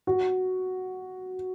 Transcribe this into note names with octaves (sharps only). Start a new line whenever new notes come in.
F#4